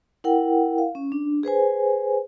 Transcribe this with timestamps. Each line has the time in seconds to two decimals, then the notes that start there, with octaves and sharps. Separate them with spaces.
0.24 E4 A#4 F#5 G5
0.78 F5
0.95 C#4
1.12 D4
1.43 G#4 B4 C5 G#5